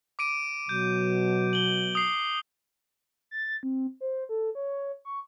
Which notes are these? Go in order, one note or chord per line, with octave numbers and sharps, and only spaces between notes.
D6 D7 D#7
B2 F#3 G6
F#7 G7
D#6 C7
A6
C4
C5
A4
C#5
C#6